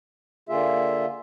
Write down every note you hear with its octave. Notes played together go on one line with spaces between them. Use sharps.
D3 A#3 F4 G#4 E5